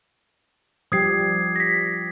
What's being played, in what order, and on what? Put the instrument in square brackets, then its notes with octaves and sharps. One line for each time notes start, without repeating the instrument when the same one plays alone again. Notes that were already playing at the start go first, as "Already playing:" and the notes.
[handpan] F3 G3 G4 [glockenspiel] D#6 G#6 C7
[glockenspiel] A#6 B6